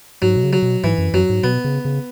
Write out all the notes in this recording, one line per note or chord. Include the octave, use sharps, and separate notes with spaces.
G#2 F#3
B2
C#3
F#3
B2
G#2 E3
F#2
F#2 F#3
G#2
B2 B3
C#3
C#3